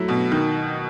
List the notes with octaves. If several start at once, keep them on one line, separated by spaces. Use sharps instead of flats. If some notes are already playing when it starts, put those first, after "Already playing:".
Already playing: F#3 A3 E4
B2
D#3